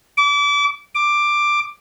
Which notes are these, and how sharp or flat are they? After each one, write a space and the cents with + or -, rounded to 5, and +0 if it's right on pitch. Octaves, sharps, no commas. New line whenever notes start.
D6 -30
D6 +10